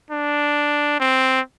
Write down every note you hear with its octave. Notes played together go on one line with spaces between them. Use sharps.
D4
C4